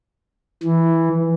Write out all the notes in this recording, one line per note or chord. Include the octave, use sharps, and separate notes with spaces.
E3